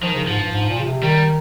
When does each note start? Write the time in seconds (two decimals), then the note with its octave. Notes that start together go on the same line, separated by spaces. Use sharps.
0.02 D#3 F3
0.16 C#3
0.27 G#2 F3
0.40 G2
0.52 G#2
0.69 A#2
0.80 C#3
0.86 C3
1.03 D#3 G3